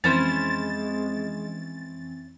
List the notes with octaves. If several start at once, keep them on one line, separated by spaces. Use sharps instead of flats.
F2 E3 G#3 C4 C#4 E4 C5 A6